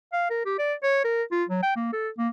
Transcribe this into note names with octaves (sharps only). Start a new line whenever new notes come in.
F5
A#4
G4
D5
C#5
A#4
F4
F#3
G5
A#3
A4
A#3